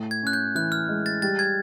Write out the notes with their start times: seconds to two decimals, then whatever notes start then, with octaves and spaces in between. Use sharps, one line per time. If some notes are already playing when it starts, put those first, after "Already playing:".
Already playing: A2
0.11 G#6
0.22 C#4 F#6
0.33 G6
0.55 E3 F#6
0.72 F6
0.88 G#3
1.06 A6
1.22 G3 A6
1.39 G#6